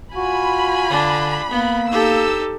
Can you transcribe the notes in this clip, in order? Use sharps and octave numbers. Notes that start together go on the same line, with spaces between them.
F4 F#4 G#5 B5
D3 D4
A#3 B3
D#4 G4 A4 E6